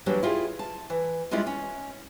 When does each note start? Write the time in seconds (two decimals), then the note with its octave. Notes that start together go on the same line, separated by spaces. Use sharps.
0.06 E3 F#3 G3 A#3 D4 G4
0.23 E4 F4 G4 G#4
0.59 A5
0.90 E3
1.31 G3 G#3 C#4 D4 E4 F4
1.47 C#4